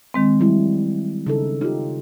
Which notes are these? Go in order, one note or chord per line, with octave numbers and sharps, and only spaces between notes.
D#3 G#3 C4
F#3 G3 E4
C#3 D#4 A4
C#3 D#4 F4 G4